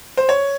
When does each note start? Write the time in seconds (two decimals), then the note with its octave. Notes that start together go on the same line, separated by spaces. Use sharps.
0.17 C5
0.29 C#5